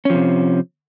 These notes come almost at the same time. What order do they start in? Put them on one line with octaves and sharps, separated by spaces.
C#4 F3 C3